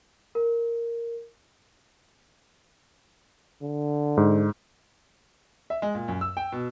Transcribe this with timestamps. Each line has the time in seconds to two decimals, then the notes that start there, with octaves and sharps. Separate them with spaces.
0.35 A#4
3.62 D3
4.17 G#2
5.70 E5
5.82 G#3
5.95 A#2
6.08 F#2
6.21 E6
6.37 G5
6.52 B2